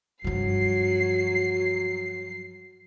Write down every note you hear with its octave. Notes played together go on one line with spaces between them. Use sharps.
G2 F3 F#3 C7